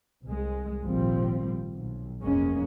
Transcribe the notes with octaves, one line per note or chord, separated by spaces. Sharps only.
C2 G#3
G#1 A#2 F3 G3 C4
B1
F1 G2 G#3 A#3 C#4